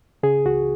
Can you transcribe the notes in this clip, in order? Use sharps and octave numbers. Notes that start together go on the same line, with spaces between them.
C#3 G#4
C#2 F#4